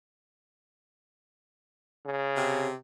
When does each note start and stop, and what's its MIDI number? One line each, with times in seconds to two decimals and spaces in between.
2.05 2.67 49
2.36 2.74 48